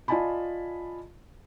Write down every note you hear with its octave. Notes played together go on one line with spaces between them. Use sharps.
F4 D5 D#5 G#5 A5 B5